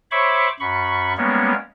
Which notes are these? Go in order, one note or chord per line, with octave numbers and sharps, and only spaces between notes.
C5 C#5 E5 B5 C#6 D6
F#2 B5 C#6
G3 G#3 A#3 B3 C#4 C#5